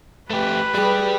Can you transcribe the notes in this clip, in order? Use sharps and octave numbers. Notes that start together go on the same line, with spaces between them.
A3 G4 B4
G3 G4 G#4